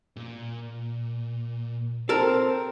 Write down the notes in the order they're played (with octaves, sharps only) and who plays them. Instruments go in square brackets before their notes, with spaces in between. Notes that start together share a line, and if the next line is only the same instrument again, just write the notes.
[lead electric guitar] A#2
[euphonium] C4 [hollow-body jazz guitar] A4 A#4